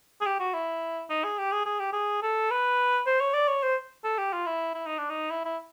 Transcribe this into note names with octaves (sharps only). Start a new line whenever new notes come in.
G#4
G4
F#4
E4
D#4
G#4
G4
G#4
G#4
G4
G#4
A4
B4
C5
C#5
D5
C#5
C5
A4
G4
F4
E4
E4
D#4
D4
D#4
E4
E4